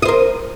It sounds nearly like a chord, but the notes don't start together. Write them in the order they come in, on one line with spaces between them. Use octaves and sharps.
D#5 C5 A#4